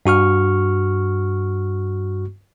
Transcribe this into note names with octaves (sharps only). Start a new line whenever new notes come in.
G2 F#4 C#6 F6